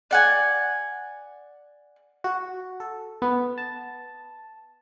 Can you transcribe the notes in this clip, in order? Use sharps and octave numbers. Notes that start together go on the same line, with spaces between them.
D5 F#5 G#5
F#4
A4
B3
A5